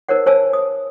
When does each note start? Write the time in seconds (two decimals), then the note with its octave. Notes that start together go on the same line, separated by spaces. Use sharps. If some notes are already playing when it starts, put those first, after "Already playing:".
0.09 D#4 A#4 C5 C#5 F#5
0.26 C5 C#5 G#5 A5 E6
0.53 D#6